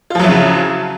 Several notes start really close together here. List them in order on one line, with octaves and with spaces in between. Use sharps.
F4 F3 F#3 E4 C#3